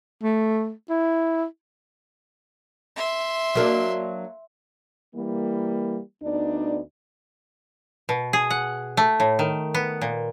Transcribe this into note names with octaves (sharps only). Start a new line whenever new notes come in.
A3
E4
E5 C6
F#3 A#3 D4
E3 G3 A#3
D2 B3 D4 D#4 D5
B2
G#4
F#5
A3
A2
D#3
B3
A#2